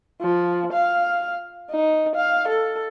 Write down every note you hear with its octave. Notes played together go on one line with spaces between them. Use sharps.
F3
F5
D#4
F5
A4